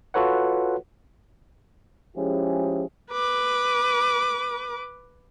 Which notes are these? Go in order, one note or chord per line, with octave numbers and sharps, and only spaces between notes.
F4 F#4 A4 B4 C#5 F#5
F3 G#3 C#4 E4 G4 G#4
B4 D6